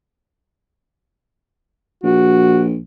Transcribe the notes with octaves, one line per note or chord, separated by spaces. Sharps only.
A#1 F#4